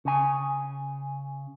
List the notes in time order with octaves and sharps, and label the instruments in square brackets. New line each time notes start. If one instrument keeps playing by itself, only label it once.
[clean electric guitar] C#3 G#5